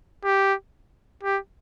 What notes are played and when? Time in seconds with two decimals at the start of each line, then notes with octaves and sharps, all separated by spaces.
0.24 G4
1.23 G4